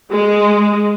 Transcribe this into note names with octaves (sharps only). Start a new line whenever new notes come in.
G#3